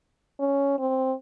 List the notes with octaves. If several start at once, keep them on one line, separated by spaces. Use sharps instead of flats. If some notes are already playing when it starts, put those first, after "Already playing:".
C#4
C4